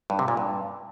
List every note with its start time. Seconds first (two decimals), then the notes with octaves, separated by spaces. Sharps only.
0.10 G2
0.19 C3
0.28 A#2
0.37 G2